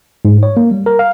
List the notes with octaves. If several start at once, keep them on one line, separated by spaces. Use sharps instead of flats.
G#2
C#5
A#3
G3
A#4
F5